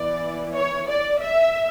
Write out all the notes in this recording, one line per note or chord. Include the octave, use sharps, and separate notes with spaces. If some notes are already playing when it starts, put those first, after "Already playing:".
Already playing: E3 B3 E4 D5
C#5
D5
E5